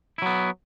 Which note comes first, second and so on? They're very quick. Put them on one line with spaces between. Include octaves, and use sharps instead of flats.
E4 F#3 B3